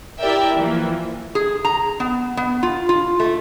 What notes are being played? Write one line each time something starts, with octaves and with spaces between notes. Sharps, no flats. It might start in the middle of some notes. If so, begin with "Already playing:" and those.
E4 G4 A#4 D5 E5 G5
E3 F3 A#3
G#4
A#5
B3
B3
F4
F4
A3